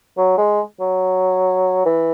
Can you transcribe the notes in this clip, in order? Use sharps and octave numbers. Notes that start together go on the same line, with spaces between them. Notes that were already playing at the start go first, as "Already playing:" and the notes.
F#3
G#3
F#3
E3